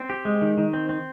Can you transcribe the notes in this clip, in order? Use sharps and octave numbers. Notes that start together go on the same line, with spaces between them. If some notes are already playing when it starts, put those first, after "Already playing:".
Already playing: C4
G4
G#3
D#3
D#3
C4
C4